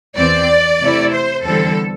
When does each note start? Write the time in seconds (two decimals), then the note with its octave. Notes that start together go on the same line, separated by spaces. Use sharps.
0.17 E2 E3 C4 D5
0.80 C3 A3 E4
1.13 C5
1.45 E2 D3 G3 C4 A4